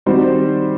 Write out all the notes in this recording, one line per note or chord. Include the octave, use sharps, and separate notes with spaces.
D#3 G3 C4 F#4 C5